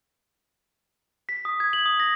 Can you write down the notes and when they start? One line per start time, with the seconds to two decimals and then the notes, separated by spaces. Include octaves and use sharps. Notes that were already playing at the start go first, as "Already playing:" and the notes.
1.29 B6
1.45 D#6
1.60 G#6
1.73 F#7
1.86 D#6
2.00 A#6